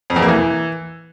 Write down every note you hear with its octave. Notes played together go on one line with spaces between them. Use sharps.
F2
E2
A#3
E3